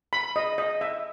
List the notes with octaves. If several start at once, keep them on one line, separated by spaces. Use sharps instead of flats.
B5
D#5
D#5
E5